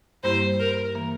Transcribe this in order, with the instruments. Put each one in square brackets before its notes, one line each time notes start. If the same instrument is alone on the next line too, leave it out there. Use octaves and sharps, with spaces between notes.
[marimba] G2 G3 A#3 E4 G4 [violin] C5
[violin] A#4
[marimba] E3 A#3